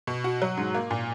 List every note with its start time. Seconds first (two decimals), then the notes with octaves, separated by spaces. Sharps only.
0.07 B2
0.24 F#4
0.42 F#3
0.57 G#2
0.74 A#3
0.91 A#2